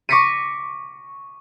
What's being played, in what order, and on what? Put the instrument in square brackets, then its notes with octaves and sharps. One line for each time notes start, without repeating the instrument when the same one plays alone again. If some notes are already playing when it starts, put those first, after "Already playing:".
[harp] C#6 D6 A#6 B6 C#7 D#7